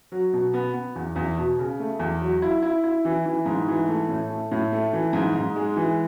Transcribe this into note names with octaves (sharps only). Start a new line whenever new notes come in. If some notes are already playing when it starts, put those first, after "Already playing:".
F#3
B2
B3
B3
E2
E2
B2
C#3
A3
E2
F#3
E4
E4
E4
E3
E3
G#2
E3
A3
A2
A3
A2
A3
E3
G#2
G#2
G#3
E3